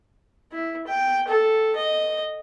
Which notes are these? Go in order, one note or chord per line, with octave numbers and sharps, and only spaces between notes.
E4
G5
A4
D#5